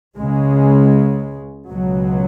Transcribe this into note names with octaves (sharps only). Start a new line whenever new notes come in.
C#2 C#3 G#3
C#2 B2 F#3